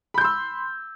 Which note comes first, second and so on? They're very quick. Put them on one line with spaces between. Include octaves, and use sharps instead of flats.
B5 G6 C6 E6